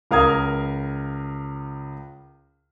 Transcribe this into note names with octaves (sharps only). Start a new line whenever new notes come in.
C#2 A#4 F5 D#6 F6 G#6